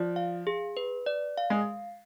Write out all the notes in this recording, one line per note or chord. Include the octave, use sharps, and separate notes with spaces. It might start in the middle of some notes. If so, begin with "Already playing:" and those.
Already playing: F3 D5
F5
G#4
B4
D5
F5
G#3